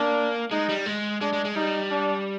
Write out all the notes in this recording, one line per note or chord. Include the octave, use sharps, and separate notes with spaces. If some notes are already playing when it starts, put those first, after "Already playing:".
Already playing: A#3 D4
G#3 D#4
G3
G#3
G#3 D4
G#3
G#3
G3 D#4
D4